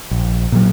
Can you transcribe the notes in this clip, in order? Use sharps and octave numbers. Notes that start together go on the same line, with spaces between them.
A#1
A#2 F#3